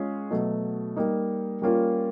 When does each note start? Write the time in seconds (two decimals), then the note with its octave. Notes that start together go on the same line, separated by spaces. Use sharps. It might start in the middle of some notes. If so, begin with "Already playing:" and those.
Already playing: G#3 C#4 F4 G#4
0.31 B2 F#3 A3
0.96 G3 A#3 D#4
1.62 G3 A#3 C#4 F4